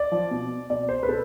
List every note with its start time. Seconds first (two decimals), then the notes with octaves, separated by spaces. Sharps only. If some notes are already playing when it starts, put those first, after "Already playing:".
Already playing: D5
0.12 F3
0.31 B2
0.70 B2 D5
0.89 C5
1.03 B4
1.08 B2 A4